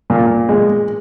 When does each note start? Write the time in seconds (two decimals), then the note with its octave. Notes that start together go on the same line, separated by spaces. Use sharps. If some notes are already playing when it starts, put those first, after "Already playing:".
0.10 A#2
0.49 G#3